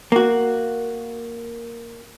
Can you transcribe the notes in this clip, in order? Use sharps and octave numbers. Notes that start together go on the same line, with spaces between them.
A#3 F#4